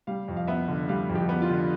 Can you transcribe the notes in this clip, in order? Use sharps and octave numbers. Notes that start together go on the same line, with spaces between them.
G3 F5
F2
F5
B3 E5
D3
G3 F5
F2
G4
B3
F4
D3